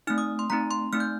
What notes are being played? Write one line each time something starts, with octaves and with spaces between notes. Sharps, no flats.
A3 C4 D#4 F6
D#6
C6
A3 C4 D#4 A#5
C6
A3 C4 D#4 F6
G6